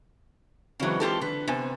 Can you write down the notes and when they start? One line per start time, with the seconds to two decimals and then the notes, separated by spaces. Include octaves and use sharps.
0.80 C#3 E3 F#3 G#3 C4
1.00 F4 G4 A4
1.21 D3 B4
1.47 C3 B3 C4 G#5